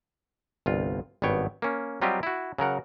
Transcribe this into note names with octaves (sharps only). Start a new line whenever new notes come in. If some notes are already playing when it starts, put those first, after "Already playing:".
G1 C2 F4
G#1 G2 B3 C#5 G5
A#3 C#4
F#3 G3 C4 F4 G4 D#5
E4 F#4
C#3 F#3 A#4 F#5